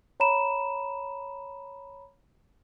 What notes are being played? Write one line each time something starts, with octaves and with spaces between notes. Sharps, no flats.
C#5 A#5 B5 E7